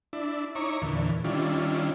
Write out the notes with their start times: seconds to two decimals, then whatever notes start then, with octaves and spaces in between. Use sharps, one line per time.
0.13 D4 E4
0.55 D#4 E4 C#5 A#5 C#6 D6
0.82 E2 A#2 D3 E3
1.24 D#3 G3 C#4 D4 E4 F4